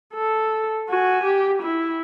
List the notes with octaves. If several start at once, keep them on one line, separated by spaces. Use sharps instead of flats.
A4
F#4 G#5
G4
E4